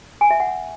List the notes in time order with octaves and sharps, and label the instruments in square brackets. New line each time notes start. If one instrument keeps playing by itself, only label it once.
[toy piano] G#5
E5
F#5